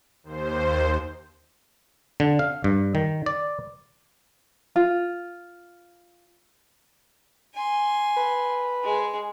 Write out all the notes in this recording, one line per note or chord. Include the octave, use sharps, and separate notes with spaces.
D#2 C5
D3
F5
G2
D#3
D5
F4
G#5 C6
B4
G#3 G#4